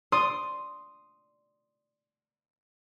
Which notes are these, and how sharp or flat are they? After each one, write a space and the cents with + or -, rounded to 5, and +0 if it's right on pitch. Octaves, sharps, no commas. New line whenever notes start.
D5 +0 C6 +0 D#6 +0